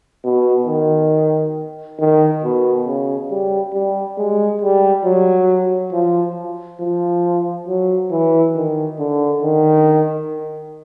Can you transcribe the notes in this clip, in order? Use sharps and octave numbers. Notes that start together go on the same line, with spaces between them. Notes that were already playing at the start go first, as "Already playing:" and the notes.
B2
D#3
D#3
B2
C#3
G3
G3
G#3
G3
F#3
F3
F3
F#3
E3
D#3
D3
D#3